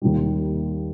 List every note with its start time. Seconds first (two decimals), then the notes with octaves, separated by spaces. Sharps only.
0.02 D#2 D#3 G3